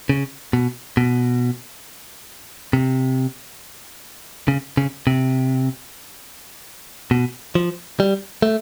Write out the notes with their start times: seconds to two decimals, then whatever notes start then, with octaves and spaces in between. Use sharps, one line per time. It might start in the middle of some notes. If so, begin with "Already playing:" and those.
0.09 C#3
0.53 B2
0.97 B2
2.73 C3
4.48 C#3
4.77 C#3
5.07 C3
7.11 B2
7.55 F3
8.00 G3
8.42 A3